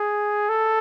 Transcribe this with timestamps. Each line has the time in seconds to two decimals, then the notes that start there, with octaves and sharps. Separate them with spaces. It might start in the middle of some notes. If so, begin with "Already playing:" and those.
Already playing: G#4
0.49 A4